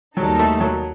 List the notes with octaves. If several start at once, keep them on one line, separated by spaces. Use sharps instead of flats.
D#2 D#3 F#3 G3 D#4 A4
A3
F#3